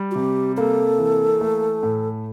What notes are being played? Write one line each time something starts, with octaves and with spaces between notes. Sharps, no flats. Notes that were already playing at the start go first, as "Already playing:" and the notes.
Already playing: G3
F#4
C3 G4
A#3 A4
E3
A3
A2